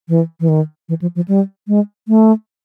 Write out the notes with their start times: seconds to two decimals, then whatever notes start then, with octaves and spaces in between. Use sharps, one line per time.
0.09 E3
0.40 E3
0.49 D#3
0.89 E3
1.02 F3
1.16 F3
1.28 G3
1.68 G#3
2.08 A3